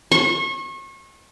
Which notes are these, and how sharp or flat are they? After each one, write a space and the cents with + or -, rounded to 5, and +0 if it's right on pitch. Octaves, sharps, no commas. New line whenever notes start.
C#6 -35